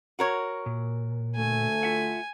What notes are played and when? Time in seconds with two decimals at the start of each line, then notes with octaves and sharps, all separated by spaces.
0.19 F#4 A#4 C#5
0.66 A#2
1.36 D2 A3 G#5
1.83 F4 E5 F#5